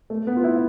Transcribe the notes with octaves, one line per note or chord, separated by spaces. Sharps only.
A3
B3
F4
E4